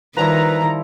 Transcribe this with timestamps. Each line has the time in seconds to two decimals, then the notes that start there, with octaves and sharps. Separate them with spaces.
0.17 D#3 F3 G3 E4 B4 A#5